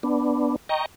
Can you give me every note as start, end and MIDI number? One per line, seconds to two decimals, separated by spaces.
0.03 0.56 59
0.03 0.56 62
0.69 0.86 75
0.69 0.86 79
0.69 0.86 82
0.69 0.86 85